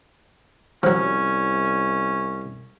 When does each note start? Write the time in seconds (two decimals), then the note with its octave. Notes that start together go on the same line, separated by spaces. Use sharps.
0.83 C2 F3 F#3 C#4